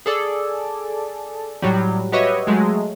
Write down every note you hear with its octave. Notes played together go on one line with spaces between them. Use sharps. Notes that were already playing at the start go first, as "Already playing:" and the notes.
G#4 A4 D5
A2 F#3 G3
F#4 G4 B4 C#5 D#5 E5
F#3 G#3 A3